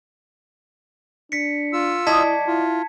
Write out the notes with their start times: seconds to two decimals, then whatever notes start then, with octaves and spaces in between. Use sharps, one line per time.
1.32 D4 B6 C#7
1.73 F4 E6
2.07 F#3 E4 D5 D#5 A5 G#6 B6
2.47 E4 F4